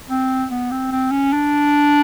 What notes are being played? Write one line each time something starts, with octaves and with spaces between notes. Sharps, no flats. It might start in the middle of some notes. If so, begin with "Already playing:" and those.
C4
B3
C4
C4
C#4
D4